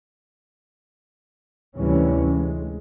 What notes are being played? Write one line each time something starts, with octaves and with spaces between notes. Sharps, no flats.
D2 C3 E3 G3 C#4
G#3